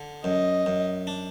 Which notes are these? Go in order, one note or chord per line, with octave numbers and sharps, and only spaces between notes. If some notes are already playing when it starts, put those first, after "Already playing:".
Already playing: D3
F#2 D#5
F#2
D4